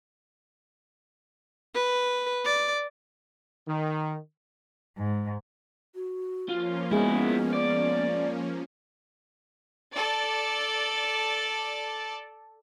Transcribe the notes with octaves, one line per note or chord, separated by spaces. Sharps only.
B4
D5
D#3
G#2
F#4
F3 A#3 C#4 F4
G#3 B3 E4 F#4 G#4
D5
A4 D5